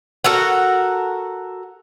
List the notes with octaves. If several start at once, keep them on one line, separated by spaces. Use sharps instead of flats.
F#4 A4 A#4 F#5